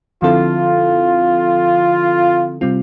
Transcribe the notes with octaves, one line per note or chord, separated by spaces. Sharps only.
D3 F3 C4 E4 F4 A4
C3 G3 C4 F4